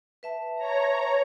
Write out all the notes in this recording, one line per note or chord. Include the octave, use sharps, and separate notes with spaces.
B4 E5 A5
C#5 A#5